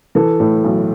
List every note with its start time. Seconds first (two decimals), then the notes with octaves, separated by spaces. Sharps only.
0.15 E3 A4
0.40 A2
0.64 B1